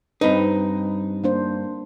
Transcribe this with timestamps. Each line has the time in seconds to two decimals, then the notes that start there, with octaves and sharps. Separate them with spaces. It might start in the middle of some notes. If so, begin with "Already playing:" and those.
0.21 G2 C4 D#4 B4
1.24 A#3 D4 C5